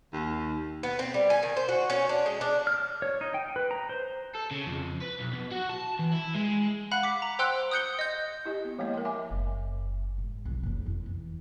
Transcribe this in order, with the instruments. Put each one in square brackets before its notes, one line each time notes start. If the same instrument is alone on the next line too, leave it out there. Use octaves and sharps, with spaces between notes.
[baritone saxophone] D#2
[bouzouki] B3
C4
G3
G#5
D#3
C5
F#4
C#4
D4
G#3
D4
[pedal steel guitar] F6
C#5
D#4
G5
B4
A#5
C5
[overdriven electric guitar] A4
C#3
F2
B4
B1
B2
F#4
A5
E3
E4
G#3
[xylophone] F5 F#5 B5 F#6
D6 B6
A#5
C5 F#5 G5 C6 E6 F#6
D#6 F#6 G6 C#7 G7
D#5 G6
[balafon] E4 G4 D#5
B3
F3 G#3 A#3 C#5 D#5
A#4 G5
E5 G#5 D6
[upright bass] F#1
G#2
C2 F3
F#1 C#3
F2 E4
E3